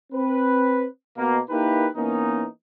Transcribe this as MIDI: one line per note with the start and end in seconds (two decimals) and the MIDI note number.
0.13 0.84 60
0.13 0.84 71
1.18 1.38 47
1.18 1.38 58
1.50 1.86 58
1.50 1.86 63
1.50 1.86 64
1.50 1.86 67
1.50 1.86 70
1.50 1.86 71
1.96 2.45 52
1.96 2.45 58
1.96 2.45 59
1.96 2.45 61
1.96 2.45 63